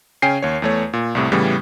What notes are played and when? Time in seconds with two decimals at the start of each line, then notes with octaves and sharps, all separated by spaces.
0.22 C#3 C#4 G5 G#5 C7
0.42 D#2 C#5
0.62 E2 A3 C#5
0.93 A#2
1.15 C2 A2 C3
1.32 A2 C#3 E3 G3 B3